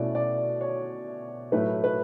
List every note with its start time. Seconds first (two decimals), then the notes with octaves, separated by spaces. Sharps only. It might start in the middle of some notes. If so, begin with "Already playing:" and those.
Already playing: B2 A3 C#4 E4 D5
0.15 D5
0.61 C#5
1.52 A2 F#3 A3 E4 B4
1.84 B4